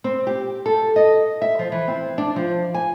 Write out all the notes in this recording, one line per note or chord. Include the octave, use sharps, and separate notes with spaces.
C4
G4
A4
D#5
E5
F3
E3
C4
D4
F3
G#5